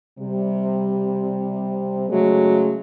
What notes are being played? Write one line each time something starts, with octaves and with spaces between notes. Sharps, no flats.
C3 G3
C#3 F#3 G#3 A3